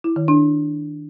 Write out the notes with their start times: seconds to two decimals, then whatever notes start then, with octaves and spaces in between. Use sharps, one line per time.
0.04 E4
0.16 D#3
0.28 D4